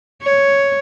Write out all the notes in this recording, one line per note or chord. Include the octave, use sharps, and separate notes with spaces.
C#5